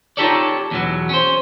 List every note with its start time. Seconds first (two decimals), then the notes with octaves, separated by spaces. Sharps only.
0.17 D#4 F4 G4 A4 C#5 D5
0.71 E2 B2 F#3
1.09 C#4 C5